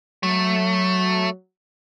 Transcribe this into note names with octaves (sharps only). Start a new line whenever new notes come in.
F#3 A3